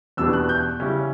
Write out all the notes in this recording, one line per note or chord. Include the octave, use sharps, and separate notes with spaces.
E2 B2 G3 B3 D4 E6
F#6
G6
C#3 G3 C#4 E4